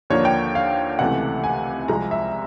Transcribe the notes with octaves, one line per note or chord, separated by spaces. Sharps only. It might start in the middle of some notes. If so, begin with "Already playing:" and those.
D#2 D3 F3 A#3 D4 C#5
G5
F5
C#2 C3 E3 A3 F#5
G#5
C2 C3 F3 G#3 A#5
E5